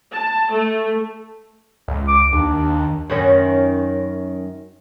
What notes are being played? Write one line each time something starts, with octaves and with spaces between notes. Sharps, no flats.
A5
A3
C#2
D6
D#2 D4
F#2 D#3 C#4